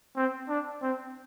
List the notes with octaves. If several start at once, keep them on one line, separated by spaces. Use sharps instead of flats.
C4
D4
C4